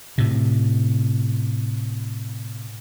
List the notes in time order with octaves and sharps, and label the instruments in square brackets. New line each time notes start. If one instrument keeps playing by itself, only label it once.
[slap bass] A2 C3